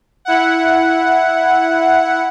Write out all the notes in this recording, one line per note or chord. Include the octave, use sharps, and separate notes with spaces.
E4 F#5